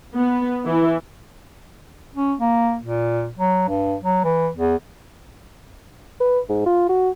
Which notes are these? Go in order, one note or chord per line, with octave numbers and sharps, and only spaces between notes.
B3
E3
C#4
A#3
A#2
F#3
G2
F#3
E3
E2
B4
G#2
F4
F#4